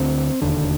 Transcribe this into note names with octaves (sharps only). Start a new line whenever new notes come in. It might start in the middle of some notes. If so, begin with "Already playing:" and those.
Already playing: D2 D3 C4
E1 D#2 D3